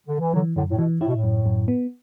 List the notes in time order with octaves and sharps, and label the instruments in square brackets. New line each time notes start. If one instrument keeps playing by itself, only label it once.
[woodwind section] D3
E3
[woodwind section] D3 F#3 [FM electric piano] E3
[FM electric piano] F#2 [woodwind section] A2 D3
[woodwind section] A2
[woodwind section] B2 [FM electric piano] E3
[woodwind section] A2 [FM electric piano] E4
[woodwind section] B2
A2
[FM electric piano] F#2
F#2
B3